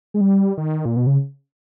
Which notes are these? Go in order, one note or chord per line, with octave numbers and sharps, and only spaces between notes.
G#3
G3
D#3
A#2
B2
C#3